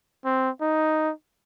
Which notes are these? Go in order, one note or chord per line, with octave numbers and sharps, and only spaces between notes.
C4
D#4